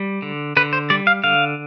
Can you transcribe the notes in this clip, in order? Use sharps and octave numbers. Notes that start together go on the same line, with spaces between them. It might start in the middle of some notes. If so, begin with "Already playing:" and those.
Already playing: G3
D3
D3 B4
C5
G3 D5
F5
D3 F5